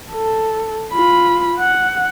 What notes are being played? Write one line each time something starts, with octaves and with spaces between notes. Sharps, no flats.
A4
F4 B5
F#5